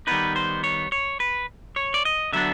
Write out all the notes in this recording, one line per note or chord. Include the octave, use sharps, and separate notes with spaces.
D#3 G3 B3 D#4 B4
C5
C#5
C#5
B4
C#5
D5
D#5
D3 F#3 B3 D4 E5